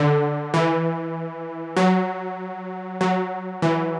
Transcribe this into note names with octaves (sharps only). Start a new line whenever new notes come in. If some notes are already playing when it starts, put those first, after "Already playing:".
Already playing: D3
E3
F#3
F#3
E3